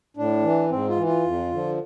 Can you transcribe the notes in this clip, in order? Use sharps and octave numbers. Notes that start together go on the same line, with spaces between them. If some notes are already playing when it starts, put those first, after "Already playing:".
A2 D4
E3
G#2 C4
F4
E3
F4
F2
D3 F3